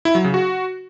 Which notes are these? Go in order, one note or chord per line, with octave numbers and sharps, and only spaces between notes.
E4
F#3
C#3
F#4